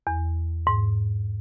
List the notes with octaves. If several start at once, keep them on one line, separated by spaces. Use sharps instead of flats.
E2
G#2